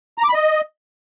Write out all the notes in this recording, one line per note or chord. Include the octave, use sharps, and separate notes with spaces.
A#5
D6
B5
D#5